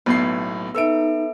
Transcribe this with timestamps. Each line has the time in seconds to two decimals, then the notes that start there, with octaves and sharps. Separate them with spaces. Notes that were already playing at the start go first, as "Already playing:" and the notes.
0.06 B1 A2 B3 C7
0.75 D#4 A4 B4 E5 E6 D7